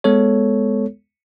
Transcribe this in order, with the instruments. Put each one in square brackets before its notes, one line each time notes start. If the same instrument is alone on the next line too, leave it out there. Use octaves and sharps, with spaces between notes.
[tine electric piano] G#3 B3 A4 C#5